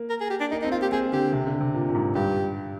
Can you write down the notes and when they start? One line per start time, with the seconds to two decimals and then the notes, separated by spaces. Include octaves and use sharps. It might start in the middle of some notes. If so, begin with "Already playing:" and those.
Already playing: A#3
0.10 A#4
0.21 G#4
0.30 G4
0.41 D4
0.51 A#3 D#4
0.62 D#4
0.64 C4
0.72 A#3 F4
0.82 G4
0.92 C4 G#4
1.12 D3 G4
1.33 C3
1.47 D3
1.60 C3
1.74 A#2
1.89 A#2
1.95 G#2
2.15 G2 G4